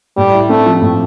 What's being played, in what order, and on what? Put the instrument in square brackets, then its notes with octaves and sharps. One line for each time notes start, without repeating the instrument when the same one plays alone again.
[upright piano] A2 [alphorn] G3
[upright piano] E4
[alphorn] A3 [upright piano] C4
[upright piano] F3
A2